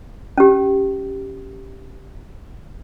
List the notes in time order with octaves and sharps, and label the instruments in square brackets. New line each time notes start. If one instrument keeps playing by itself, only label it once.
[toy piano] C#4 G4